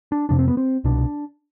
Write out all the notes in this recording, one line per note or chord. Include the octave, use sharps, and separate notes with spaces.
D4
F2 C3 D4
C4
B3
C4
C2 B2 D4